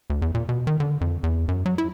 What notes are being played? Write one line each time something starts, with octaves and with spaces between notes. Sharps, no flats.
D2
E2
A#2
B2
D#3
D3
F2
E2
F#2
F#3
E4